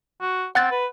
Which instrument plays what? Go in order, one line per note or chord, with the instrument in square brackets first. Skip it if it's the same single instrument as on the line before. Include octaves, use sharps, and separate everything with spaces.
[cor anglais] F#4
[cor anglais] C4 [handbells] F#5 F#6 A6
[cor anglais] B4